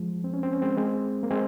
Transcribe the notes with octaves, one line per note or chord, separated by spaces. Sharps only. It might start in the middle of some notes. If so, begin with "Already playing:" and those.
Already playing: F3 G#3
C4
C#4
C4
C#4
G#3 C4
G#3 C4
A#3
G#3 C4